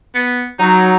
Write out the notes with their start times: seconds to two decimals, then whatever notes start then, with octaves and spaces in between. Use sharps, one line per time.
0.15 B3
0.59 F#3 D#4